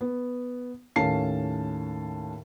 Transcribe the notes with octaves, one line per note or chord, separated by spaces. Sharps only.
B3
D#2 A2 C#4 F5 A5 C7